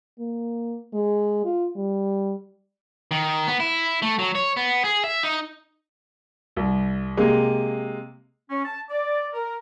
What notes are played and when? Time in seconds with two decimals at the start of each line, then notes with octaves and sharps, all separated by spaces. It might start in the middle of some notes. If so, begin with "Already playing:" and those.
0.19 A#3
0.93 G#3
1.45 F4
1.76 G3
3.11 D#3
3.47 B3
3.60 E4
4.02 A3
4.19 F#3
4.35 C#5
4.57 B3
4.84 G#4
5.04 E5
5.23 D#4
6.57 C2
7.17 C3 G#3 A#3
8.50 C#4
8.65 A5
8.90 D5
9.33 A#4